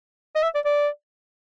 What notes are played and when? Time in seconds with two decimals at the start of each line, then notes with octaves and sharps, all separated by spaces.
0.36 D#5
0.43 E5
0.55 D5
0.65 D5